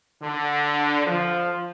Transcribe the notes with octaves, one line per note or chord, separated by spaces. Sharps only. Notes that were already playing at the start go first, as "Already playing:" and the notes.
D3
F3